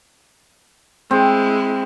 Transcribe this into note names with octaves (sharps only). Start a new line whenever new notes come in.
G#3 C4 E4